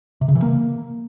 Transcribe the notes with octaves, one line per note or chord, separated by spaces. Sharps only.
C3
C#3
E3
A#3